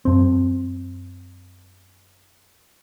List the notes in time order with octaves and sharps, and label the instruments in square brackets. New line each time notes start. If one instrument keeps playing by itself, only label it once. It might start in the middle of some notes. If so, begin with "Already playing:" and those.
[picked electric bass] F#2 C4